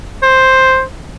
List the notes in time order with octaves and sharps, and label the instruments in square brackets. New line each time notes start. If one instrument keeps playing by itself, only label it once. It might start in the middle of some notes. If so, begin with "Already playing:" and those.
[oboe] C5